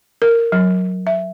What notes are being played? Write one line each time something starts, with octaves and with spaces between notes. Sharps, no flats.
A#4
F#3
E5